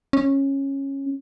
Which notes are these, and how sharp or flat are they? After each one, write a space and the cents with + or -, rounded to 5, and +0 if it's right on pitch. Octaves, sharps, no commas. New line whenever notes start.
C#4 -15